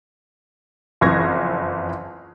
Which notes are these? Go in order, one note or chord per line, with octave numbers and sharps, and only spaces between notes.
F#1 F2 E3 C#6 G#6 A#6